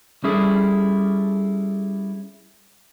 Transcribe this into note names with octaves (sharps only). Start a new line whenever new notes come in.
G3 C#4 E4 G#4 A4